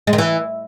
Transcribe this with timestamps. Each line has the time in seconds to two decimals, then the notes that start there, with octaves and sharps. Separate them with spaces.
0.07 G#3
0.13 D#3
0.18 E3